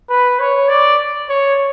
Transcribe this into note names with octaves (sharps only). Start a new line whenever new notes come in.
B4
C#5
D5
C#5